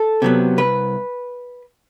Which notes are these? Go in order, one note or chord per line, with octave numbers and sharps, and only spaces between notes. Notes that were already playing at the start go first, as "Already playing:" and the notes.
Already playing: A4
C3 F#3 B3
C2 B4